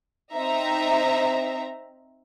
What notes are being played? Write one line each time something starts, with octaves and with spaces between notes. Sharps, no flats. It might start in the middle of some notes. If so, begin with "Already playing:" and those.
C4 D#4 E5 A#5